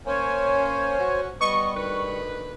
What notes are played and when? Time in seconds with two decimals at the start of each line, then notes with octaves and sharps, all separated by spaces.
0.07 A#3 C#4 C5 C#5 G#5
0.99 C#4 F#4
1.41 G3 B3 D#5 C#6
1.75 D2 D#3 B4